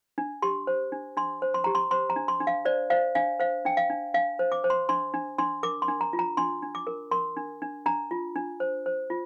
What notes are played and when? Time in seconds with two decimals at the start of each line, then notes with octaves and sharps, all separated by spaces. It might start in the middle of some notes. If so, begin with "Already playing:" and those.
0.18 D4
0.42 G4 C6
0.67 C5
0.92 D4
1.17 D4 C6
1.42 C5
1.54 C6
1.64 G4 A#5
1.75 C6
1.91 C5 C6
2.10 A#5
2.16 D4
2.28 C6
2.40 D4
2.47 F5
2.65 C5 D5
2.90 C5 F5
3.15 D4 F5
3.39 C5 F5
3.65 D4 G5
3.77 F5
3.90 D4
4.14 D4 F5
4.39 C5
4.52 D6
4.64 C5
4.70 C6
4.89 D4 C6
5.14 D4
5.38 D4 C6
5.63 A#4 D6
5.82 C6
5.88 D4
6.01 A#5
6.13 F4
6.19 A#5
6.37 D4 C6
6.62 D4
6.75 D6
6.87 A#4
7.11 A#4 C6
7.37 D4
7.62 D4
7.86 D4 A#5
8.11 F4
8.36 D4
8.60 C5
8.86 C5
9.10 F4